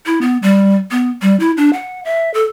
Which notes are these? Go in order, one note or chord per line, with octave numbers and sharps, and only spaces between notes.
E4
B3
G3
B3
G3
E4
D4
F#5
E5
A4